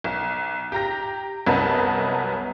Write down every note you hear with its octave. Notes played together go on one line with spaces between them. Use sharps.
B1
G4 A#5 A#6
C2 F#2 B3 B4 D#5 A5